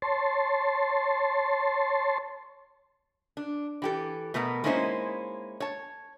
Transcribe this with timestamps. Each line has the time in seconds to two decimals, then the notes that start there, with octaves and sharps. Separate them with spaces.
0.02 C#5 A5 C6
3.37 D4
3.82 E3 G4 A4
4.34 B2 A3 B3 A#4 A#5
4.64 G#3 A#3 C#4 D#4 E4 C5
5.60 C#5 A5